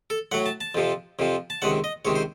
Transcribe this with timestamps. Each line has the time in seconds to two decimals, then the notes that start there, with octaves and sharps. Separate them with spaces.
0.10 A4
0.32 A2 F#3 F#5
0.46 A5
0.61 A5
0.75 F2 C3 F3
1.19 F2 C3 F3
1.50 A5
1.62 C#2 C3 D#3 F#5
1.84 D#5
2.05 C#2 C3 D#3 C#5
2.16 C5